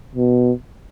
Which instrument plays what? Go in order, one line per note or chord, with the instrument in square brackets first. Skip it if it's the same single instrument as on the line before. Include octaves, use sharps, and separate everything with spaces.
[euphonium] B2